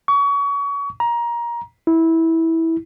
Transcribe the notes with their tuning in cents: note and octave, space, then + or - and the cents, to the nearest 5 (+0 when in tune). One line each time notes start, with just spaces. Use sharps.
C#6 +30
A#5 +20
E4 -15